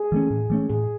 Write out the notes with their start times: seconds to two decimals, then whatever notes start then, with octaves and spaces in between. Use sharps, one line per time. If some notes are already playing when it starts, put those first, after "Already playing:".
Already playing: G#4
0.12 E3 A3 C#4
0.31 A2
0.50 E3 A3 C#4
0.70 A2 G#4